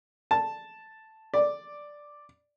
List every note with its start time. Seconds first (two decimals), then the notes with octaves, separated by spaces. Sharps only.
0.31 A5
1.34 D5